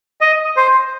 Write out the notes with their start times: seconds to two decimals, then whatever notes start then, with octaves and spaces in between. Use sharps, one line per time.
0.21 D#5
0.57 C5